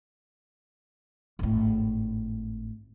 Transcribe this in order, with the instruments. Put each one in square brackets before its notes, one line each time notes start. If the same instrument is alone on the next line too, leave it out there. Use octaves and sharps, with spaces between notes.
[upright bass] G#1 A2